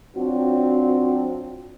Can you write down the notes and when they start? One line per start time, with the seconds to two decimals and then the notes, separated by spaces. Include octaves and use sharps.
0.15 F#3 C4 D4 F4 F#4